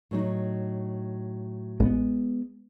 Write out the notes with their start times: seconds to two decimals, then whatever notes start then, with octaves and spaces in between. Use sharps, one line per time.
0.11 A2 F#3 D#4
1.80 A1 G#3 B3